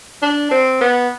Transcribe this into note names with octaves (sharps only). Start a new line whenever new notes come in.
D4
C4
B3